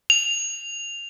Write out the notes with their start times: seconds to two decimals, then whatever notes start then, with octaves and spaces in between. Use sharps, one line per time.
0.10 F7